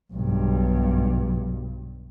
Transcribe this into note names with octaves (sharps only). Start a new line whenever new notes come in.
B1 G2